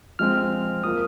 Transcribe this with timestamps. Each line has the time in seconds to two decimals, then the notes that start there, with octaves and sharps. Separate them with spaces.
0.19 F3 G#3 C4 F6
0.84 F3 A#3 F4 D#6